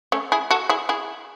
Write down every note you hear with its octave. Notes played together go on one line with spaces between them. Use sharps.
A3 C#4
E4 G#4
F#4 A4
E4 G#4
E4 G#4